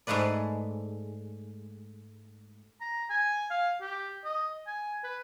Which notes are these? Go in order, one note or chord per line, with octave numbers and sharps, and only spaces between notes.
G#2 G#3 A3 B4 D5
A#5
G#5
F5
G4
D#5
G#5
B4